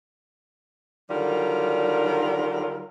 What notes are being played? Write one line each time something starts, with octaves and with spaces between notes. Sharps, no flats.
D3 D#3 F#3 G3 F4 A#4